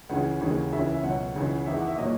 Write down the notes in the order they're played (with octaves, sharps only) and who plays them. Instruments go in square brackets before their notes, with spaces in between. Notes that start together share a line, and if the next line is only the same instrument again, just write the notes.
[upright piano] C#2 C#3 E3 G#3 F#5
D#2 C#3 E3 G#3
C#2 C#3 E3 E5
E5
C#2 B2 F#3 F#5
C#2 C#3 E3
E2 D#3 G#3 E5
F#5
E5
A#2 F#3 D#5